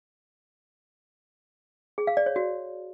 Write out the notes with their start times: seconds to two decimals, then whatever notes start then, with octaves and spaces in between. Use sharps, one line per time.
1.98 G#4
2.07 F5
2.17 D5
2.26 C#5
2.36 F#4